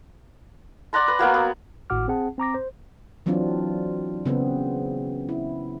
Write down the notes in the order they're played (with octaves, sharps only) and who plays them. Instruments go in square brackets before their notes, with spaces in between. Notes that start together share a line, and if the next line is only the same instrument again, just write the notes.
[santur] D5 F#5 A#5 C6
B4
F#3 A#3 B3 F#4
B3
[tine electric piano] G#1 A2 F#4 F#5 D6 F6
C4 G#4 F#5 A5
C4 A#5 D6 A#6
C5
[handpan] E3 F#3 C4 D4 F4
C#3 B3 C4
E4